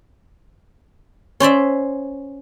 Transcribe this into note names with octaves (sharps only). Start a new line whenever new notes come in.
C#4 C5 D5 E5